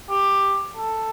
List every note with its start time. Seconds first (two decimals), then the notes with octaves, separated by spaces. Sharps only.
0.10 G4
0.76 A4